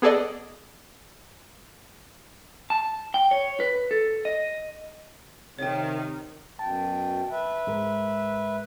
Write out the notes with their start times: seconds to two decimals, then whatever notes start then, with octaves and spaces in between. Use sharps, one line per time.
0.02 B3 G#4 A4 D5 D#5
2.70 A5
3.14 G5
3.31 C#5
3.60 B4
3.91 A4
4.25 D#5
5.59 C3 D#3 C#5 G5
6.59 F#2 B2 G5 A5
7.30 B4 E5
7.67 G#2 G#3 A#4